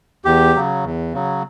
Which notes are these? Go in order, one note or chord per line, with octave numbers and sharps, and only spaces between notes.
E2 G4
C#3 F#3
E2
C#3 F#3